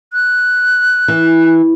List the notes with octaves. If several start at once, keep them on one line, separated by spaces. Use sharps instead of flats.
F#6
E3